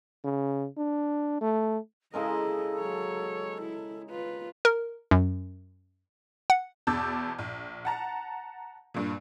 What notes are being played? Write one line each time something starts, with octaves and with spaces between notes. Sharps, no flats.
C#3
D4
A3
C#3 G#3 E4 A4 A#4 D#5
F#3 C#5
E4
F4 B4
A#4
F#2
F#5
E2 B2 A5 D6 E6 G6
A#1
F#5 A5 A#5
G2 A#2